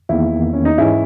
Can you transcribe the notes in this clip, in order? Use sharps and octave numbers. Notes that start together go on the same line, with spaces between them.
E2 D#3 A#3 E4
C#4
D#4
G#2 E3 G#3 C#4 E4